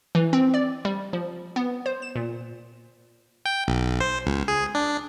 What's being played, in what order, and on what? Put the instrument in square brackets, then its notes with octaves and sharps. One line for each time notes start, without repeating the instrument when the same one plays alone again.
[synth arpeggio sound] E3
C4
D5
G3
F3
B3
C5
E7
A#2
[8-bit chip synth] G5
B1
C5
C#2
G#4
D4